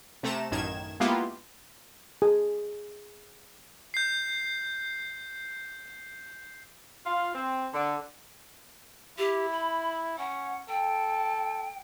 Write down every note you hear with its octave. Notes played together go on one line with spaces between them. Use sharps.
C3 A3 A#5 E7
A1 F#2 D#3 G#6 E7
G#3 A#3 B3 E4 F4 G4
G#4
G6 C7
F4
C4
D3
E4 G4
B5
C#4 F#5
A4 G5